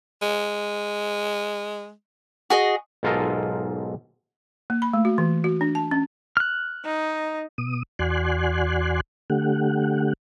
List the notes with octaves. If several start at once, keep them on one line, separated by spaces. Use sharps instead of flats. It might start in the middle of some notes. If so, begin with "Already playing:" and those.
G#3
F#4 G#4 D#5
B1 G#2 F4 A4 A#4 D#5
A#3
B5
A3
F#4
E3
F#4
D4
A5
C#4
F6 F#6
D#4
B2 D#6
E2 F#4 D5 G#5 C6 F#6
D3 A3 G4 F#5